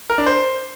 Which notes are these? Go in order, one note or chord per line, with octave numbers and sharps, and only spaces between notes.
A#4
D4
C5